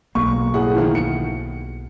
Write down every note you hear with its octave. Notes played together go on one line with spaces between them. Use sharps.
B1 A#3 C#6
A2 G#4 F#5
D#3 F3 E4
C#7